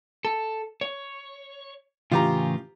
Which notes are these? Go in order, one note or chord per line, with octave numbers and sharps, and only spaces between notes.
A4
C#5
A2 C#3 E3 F4 G4 A#5